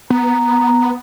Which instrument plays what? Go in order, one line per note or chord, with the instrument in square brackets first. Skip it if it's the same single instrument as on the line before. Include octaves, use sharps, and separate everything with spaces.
[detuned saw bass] B3 [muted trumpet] A#5